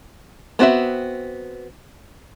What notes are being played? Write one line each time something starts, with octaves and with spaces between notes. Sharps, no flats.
B3 C4 F#4 D#5 E5